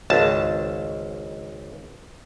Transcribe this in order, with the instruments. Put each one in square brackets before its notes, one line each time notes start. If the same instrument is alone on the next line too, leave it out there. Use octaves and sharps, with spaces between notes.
[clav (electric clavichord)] G#1 C#2 A5